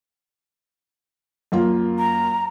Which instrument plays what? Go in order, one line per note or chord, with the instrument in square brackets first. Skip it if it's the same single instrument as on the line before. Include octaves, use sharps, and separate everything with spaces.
[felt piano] F#2 A#3 F4
[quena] A#5